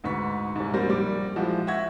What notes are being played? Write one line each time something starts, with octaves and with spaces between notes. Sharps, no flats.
D2 G#2 B4 C#6 B6
C2 G#2
F#2 A#2 G3 A#4 C5 A#6
A#1 G3 D6
F3 G#3 E4 F#4
E5 F#5 C#6 G#6 A#6